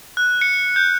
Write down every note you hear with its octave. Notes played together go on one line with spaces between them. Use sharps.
F#6
C#7
G6